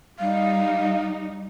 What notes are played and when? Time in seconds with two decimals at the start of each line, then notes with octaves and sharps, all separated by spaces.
0.19 G3 D#4 F5